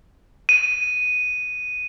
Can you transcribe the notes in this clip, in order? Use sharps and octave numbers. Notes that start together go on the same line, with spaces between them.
D#7